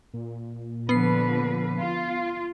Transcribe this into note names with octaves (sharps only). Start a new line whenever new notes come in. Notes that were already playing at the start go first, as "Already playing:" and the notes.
A#2
D3 F3 B3 B4 C7
F4